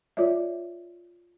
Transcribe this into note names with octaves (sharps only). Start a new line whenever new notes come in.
F4 C#5 D5 E5